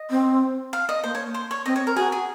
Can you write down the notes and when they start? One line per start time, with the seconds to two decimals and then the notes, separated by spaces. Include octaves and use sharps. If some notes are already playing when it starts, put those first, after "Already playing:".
Already playing: D#5
0.11 C4
0.73 F5
0.89 D#5
1.03 A#3 C5
1.15 C#5
1.34 C5
1.51 C#5
1.66 C4 D#5
1.76 C#5
1.87 A#4
1.96 F#4 G#4
2.12 G#4